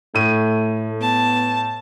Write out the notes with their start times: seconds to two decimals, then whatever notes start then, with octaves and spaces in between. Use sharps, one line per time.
0.15 A2 A3 D#7
1.01 B3 A5